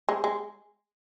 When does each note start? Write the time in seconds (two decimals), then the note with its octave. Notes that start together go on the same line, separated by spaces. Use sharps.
0.09 G#3
0.24 G#3